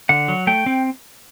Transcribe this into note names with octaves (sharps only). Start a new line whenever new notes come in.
D3 F#5
F#3
A3 G5
C4